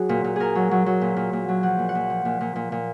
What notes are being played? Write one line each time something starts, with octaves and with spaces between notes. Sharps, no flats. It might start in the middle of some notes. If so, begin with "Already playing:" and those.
Already playing: F#3 F#4 G#4
A#2
A#2
A#2 G#4 A#4
F#3
F#3
F#3
A#2
A#2
A#2
F#3
F3 F#5
A#2
F#5
A#2
F3
A#2
A#2
A#2
A#2